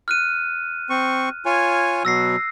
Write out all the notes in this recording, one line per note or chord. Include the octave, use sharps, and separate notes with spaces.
F6 F#6 D#7
C4 C#6
F4 C#5 G#5
B2 F#3 E6 A#6 C7